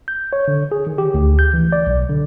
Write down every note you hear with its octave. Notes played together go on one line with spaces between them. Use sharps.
G6
C#5
D3
G#4
D#3
G4
D2
G6
E3
D5
B1
D3